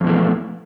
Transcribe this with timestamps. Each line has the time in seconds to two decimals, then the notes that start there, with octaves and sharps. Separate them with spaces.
0.01 F2
0.04 B2
0.07 E3
0.10 A3